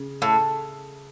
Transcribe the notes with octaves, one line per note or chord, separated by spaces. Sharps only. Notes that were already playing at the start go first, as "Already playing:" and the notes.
Already playing: C#3
A2